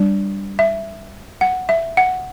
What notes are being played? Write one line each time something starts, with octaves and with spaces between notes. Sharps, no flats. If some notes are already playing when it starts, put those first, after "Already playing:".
Already playing: G3 D4
E5
F#5
E5
F#5